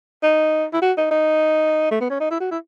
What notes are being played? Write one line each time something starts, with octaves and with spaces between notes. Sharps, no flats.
D#4
E4
F#4
D#4
D#4
A3
B3
C#4
D#4
E4
F#4
E4